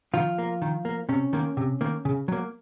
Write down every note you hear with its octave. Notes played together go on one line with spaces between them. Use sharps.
D#3 F3 F4
A#3
D#3
A#3
C3 C#4
D#3 A#3
C3
D#3 A#3
C#3
F#3 A#3